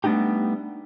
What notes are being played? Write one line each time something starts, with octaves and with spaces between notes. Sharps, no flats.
G3 A3 B3 D4 D#4 G4